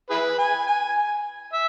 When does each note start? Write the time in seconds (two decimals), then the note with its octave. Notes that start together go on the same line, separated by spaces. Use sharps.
0.10 E4 G#4 B4
0.39 G#5
0.67 G#5
1.53 E5